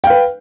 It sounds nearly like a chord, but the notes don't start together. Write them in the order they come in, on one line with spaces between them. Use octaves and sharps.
G5 F5 B4